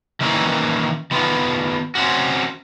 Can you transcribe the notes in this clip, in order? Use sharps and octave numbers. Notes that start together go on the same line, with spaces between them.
D#3 E3 G3 A#3 C#4 E4
D#3 B3 F4
C4 C#4 F#4